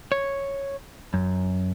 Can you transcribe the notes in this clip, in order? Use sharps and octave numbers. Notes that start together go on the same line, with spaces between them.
C#5
F#2